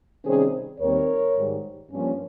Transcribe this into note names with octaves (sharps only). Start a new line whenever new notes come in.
C3 D#3 G3 C#4 G#4 C5
D#2 D#3 G3 C4 A#4 C#5
G#2 D#3 G3
G2 F3 A#3 C#4